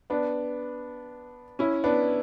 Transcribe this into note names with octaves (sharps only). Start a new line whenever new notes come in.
B3 D4
C#4 E4
B3 D4